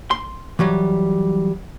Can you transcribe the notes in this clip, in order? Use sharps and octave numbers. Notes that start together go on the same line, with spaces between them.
C6
E3 F#3 G3